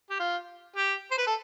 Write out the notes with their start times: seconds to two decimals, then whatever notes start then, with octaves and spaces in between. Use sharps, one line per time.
0.10 G4
0.19 F4
0.76 G4
1.11 C5
1.18 B4
1.27 A4